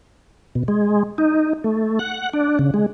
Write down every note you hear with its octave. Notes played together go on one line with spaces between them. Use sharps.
B2
G#3
D#4
A3
F#5
D4
C#3
G#3